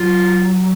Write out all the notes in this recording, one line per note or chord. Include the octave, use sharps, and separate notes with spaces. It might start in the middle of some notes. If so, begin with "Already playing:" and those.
Already playing: F#3 F4